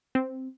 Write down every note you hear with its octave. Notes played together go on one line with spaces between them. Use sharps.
C4